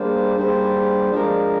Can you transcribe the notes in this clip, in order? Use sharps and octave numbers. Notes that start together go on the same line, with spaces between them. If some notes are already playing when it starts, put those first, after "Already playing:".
Already playing: G3 A#3 D4 G#4 C5
G3 A#3 D4 G#4 C5
F3 G#3 D4 F4 A#4